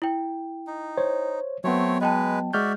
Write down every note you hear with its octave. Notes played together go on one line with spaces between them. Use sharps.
E4 G5
D#4
C5 C#5
F#3 A3 B3 C4 C#5
G#3 B4 D#5 G5 A5
G#3 F#4 D5 E5 F6 G6